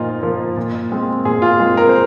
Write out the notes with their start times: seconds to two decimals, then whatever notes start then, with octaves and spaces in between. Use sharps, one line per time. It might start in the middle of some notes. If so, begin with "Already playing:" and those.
Already playing: A#2 F3 A#3 D#4 F4
0.23 F3 A#3
0.57 A#2
0.92 G#3 C4
1.25 A#2 G#4
1.42 F4
1.59 G#3 C4 G#4
1.77 A#4
1.89 C5